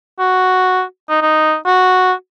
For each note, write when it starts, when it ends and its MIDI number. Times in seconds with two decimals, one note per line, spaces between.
0.20 0.82 66
1.09 1.20 63
1.22 1.56 63
1.67 2.13 66